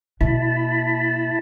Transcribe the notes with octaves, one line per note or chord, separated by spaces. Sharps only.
B2 A#3 E4 A5 B5